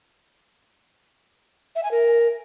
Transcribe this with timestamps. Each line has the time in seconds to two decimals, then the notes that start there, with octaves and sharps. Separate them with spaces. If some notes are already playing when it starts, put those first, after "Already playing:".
1.76 E5
1.83 G#5
1.91 A#4